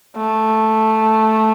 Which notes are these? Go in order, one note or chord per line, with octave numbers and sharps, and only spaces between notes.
A3